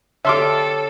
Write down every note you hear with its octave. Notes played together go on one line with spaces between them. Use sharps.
D3 G4 A4 C#5 E5 C6 D6 F6